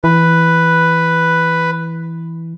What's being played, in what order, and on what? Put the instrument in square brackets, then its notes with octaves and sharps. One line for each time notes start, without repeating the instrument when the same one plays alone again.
[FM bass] E3 [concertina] B4